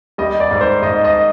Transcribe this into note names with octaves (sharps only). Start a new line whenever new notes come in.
G3 D#5
D5
G#2
C5
G#2 D#5
D#5